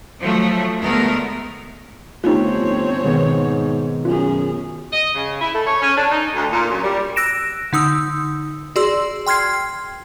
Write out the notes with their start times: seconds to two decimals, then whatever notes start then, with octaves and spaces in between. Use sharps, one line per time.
0.19 F3 F#3 A3
0.82 D2 G#3 A3 B3 A#4
2.24 G1 A3 C4 D#4 F4 G4 C#5
3.04 G#2 B2 D#3 B3
4.05 F#2 C#4 F4 G#4
4.92 D#5
5.15 C#3
5.40 E4
5.54 A3
5.67 C#5
5.81 C#4
5.96 D4
6.10 D#4
6.34 D2
6.51 A#2
6.69 F#2
6.83 G3
7.16 E6 F#6 A#6 D7 E7
7.73 D3 D#4 D#6 E6
8.76 F#4 G#4 D5 C6 E6
9.27 G5 C6 F6 G#6 C7